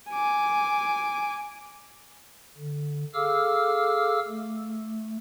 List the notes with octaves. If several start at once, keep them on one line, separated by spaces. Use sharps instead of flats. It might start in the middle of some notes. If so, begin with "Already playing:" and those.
G#5 D6
D3
G#4 A4 F5 D6 E6 F6
A3